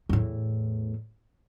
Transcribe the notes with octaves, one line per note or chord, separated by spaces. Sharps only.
E2 A2